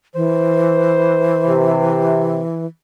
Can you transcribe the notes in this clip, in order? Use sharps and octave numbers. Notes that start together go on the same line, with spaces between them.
E3 C5
C3